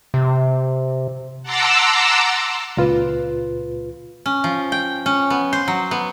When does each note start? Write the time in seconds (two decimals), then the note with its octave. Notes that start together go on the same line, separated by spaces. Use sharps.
0.14 C3
1.43 F#5 A5 A#5 C6 D6 E6
2.77 C#2 A#2 F4 B4
4.26 C#4
4.44 F3
4.72 G5
5.06 C#4
5.30 B3
5.53 C5
5.68 F#3
5.91 B3